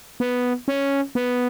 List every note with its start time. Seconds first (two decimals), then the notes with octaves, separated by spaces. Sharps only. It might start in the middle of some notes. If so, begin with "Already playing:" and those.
0.20 B3
0.68 C#4
1.15 B3